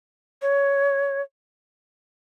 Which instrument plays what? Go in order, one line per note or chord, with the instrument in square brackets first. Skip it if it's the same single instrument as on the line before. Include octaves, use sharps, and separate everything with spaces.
[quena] C#5